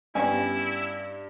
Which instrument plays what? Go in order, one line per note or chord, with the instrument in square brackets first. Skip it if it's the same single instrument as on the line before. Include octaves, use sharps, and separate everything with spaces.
[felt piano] G2 [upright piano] B3 C#4 G4 [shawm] E4 [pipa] C#5 F5 G#5